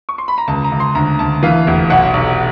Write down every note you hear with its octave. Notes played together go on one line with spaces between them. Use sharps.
C#6
C6
B5
A#5
C#2 A5
A#5
C#2
C6
D2 A#5
D2 A5
E3 F5
F1
B1 F#5
B1